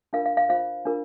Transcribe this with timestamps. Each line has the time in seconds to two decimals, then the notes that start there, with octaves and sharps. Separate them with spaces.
0.13 D4 F4 A#4 F5
0.26 F5
0.37 F5
0.49 F4 C5 F5
0.85 D4 F4 A#4